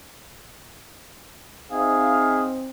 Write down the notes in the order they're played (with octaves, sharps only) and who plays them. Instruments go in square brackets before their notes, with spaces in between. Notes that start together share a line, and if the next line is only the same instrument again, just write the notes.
[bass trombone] C4 [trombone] D#4 [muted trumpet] G#4 [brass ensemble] E5 F5